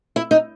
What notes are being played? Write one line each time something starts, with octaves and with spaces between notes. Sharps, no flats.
E4
D#4